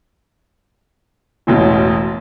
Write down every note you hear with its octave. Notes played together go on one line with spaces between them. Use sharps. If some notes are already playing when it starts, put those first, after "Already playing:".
E1 A1 B2